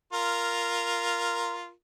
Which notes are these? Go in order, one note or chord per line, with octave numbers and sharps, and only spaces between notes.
F4 A#4